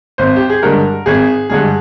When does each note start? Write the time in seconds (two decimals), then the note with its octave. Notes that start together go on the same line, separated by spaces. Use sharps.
0.18 G#1 C5
0.36 G4
0.50 G#4
0.62 G2 D3 G#3 A#4
1.06 G#1 G#4
1.50 G2 D3 G#3 G#4